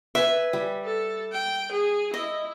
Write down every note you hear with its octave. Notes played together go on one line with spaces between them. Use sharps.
B4 E5 G#5
G3
A4
G5
G#4
E4 D#5